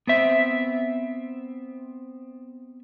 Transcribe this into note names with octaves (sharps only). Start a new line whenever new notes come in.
B3 C4 E5